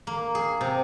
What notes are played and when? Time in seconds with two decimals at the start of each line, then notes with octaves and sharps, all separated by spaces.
0.07 A#3
0.35 G#4
0.61 C3